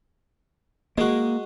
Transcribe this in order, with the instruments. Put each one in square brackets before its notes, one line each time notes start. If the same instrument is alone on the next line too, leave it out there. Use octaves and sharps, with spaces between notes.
[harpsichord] G#3 F#4 [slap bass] A#3